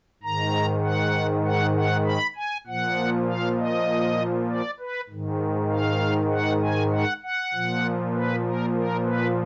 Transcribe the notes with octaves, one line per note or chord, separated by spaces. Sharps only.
G#2 D#3 A#5
F#5
F#5
F#5
B5
G#5
A#2 F3 F#5
F5
D#5
D5
B4
G#2 D#3
F5
F#5
G#5
F#5
F#5
A#2 F3
B4
A#4
A#4
B4